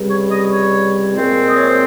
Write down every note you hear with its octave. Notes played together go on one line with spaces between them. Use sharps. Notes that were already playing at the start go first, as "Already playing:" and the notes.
Already playing: C#2 C3 G3
C#5
D#5
C#5
A#2 G#3 C4
D#5
C#5
C5